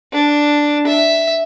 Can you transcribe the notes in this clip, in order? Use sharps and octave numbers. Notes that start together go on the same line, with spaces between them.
D4
E5